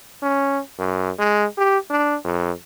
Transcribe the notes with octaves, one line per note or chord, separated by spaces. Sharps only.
C#4
F#2
G#3
G4
D4
F2